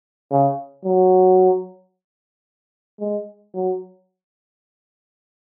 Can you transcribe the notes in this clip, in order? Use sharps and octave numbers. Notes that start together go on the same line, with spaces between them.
C#3
F#3
G#3
F#3